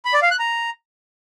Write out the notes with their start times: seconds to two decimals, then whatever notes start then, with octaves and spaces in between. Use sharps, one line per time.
0.05 B5
0.14 D5
0.22 F5
0.31 F#6
0.39 A#5